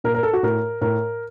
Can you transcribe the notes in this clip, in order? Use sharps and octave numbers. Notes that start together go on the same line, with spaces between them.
A#2 A#4
A#4
A4
F#4
A2 A#4
A2 A#4